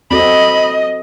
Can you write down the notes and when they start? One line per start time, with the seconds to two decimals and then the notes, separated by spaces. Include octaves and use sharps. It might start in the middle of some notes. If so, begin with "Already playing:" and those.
0.11 C4 F#4 A4 D#5 B5